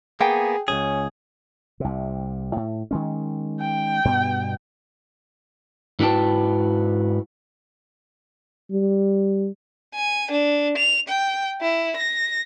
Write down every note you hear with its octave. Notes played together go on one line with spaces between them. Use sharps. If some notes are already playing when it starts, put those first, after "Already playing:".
A#3 B3 G#4 G5
C#2 F#2 C#4 G#4
C2 C3
A2
D#3 G#3 C#4
G5
G2 B2 B3
G#2 E4 F#4 B4 G5 A5
G3
G#5
D4
F7
G5
E4
A#6